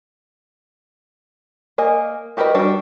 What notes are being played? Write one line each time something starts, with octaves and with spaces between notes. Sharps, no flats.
A#3 D#5 G#5
F#4 G4 A#4 B4 D#5
G3 D4 F#4 D5